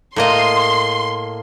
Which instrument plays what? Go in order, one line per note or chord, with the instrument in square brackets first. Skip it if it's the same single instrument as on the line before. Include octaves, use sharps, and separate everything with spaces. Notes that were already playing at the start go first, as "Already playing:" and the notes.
[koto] A2 A#3 D#5 [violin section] C6